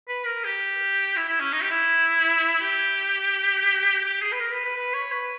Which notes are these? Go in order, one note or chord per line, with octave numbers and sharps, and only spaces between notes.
B4
A#4
G4
E4
E4
C#4
D#4
G4
E4
G4
G4
G#4
B4
A#4
B4
B4
B4
C#5
B4